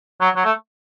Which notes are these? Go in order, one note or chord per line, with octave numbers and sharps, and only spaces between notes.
F#3
F#3
A3